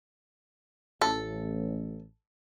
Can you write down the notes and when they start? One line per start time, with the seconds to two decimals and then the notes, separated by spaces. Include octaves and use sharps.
1.01 A1 A4